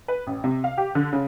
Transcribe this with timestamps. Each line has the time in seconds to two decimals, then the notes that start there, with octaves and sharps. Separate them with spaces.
0.08 B4
0.27 A1
0.44 C3
0.64 F5
0.78 G4
0.95 D3
1.13 C#3